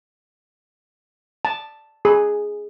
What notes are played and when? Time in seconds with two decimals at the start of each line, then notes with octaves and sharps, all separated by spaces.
1.45 A5
2.05 G#4